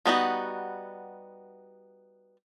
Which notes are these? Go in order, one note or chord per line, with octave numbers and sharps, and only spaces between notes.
G3 B3 D#4 F#4